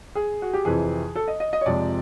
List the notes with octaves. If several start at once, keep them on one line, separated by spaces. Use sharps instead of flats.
G#4
F#4
G4
F2 C3 E3 G#4
A4
D#5
D#5
D#5
C#5
F2 C3 F3 G#3 D5